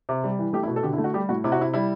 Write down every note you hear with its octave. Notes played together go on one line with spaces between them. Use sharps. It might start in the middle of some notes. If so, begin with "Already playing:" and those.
C3
G3
E3
A3 G4
E4
B2
A4
D3 G4
E4
A3
F#4
G3 G4
A2 F#4
C3 E4
F#4
C3 E4
G3 E4